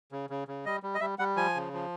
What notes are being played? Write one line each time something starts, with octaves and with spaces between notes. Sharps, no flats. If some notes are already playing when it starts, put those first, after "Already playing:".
C#3
C#3
C#3
G3 D#5
G3
D#5
G3 E5
G3 F#5
F3 G#5
C#3
F3